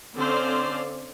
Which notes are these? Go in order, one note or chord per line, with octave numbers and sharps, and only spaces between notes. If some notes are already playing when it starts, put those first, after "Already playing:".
D3 C4 C#4 C5 D5 F5